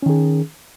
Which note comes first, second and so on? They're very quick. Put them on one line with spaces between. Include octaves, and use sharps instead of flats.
C#4 D#3 G#4